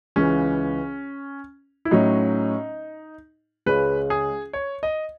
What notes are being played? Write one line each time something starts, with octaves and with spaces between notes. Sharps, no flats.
C#2 C#3 E3 C#4
E4
A2 F#3 C#4 D#4
C#2 C#3 G#3 C#4 B4
G#4
C#5
D#5